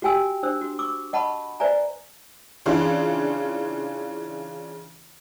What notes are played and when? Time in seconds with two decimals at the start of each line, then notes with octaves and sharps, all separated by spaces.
0.02 F#4 G4 G5 G#5 E6
0.43 D4 C5 E6
0.61 F#4
0.79 C#6 D6 E6
1.13 D#5 F#5 A5 B5 C#6
1.60 B4 C5 D5 E5 G#5 A#5
2.66 C#3 E3 D4 F4